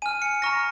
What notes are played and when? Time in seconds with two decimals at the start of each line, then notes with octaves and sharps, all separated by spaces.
0.02 G#5 F6 D#7
0.22 C#7
0.42 A#5 C#6 F6 A#6